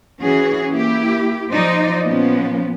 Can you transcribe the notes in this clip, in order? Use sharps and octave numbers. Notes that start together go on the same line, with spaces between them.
E3 C#4 F#4 G#4
A#3 E4 G4
F3 D#4 C5 D5 D#5
A#2 F3 B3 C#4